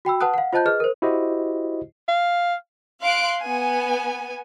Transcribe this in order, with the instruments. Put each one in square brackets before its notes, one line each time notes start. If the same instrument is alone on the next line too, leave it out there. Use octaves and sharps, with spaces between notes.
[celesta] F#4 G5 B5 E6
B4 F#5 A5 D#6 F#6
F5 F#5
F4 C5 D#5 A5 F#6 G6
G#4 B4 D#5 F6
A#4 C5
[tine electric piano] E4 F#4 G4 C5 D#5
[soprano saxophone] F5
[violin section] F5 C6 F#6 D7
B3 G#5